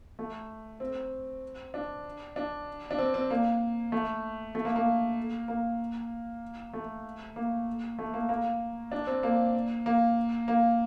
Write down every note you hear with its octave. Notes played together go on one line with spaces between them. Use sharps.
A3
C4
D4
D4
D4
C4
C4
A#3
A3
A3
A#3
A#3
A#3
A3
A#3
A3
A#3
A#3
D4
C4
A#3
A#3
A#3